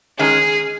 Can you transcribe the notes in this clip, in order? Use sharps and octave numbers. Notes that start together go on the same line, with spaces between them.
D#3 G#3 C#4 G#4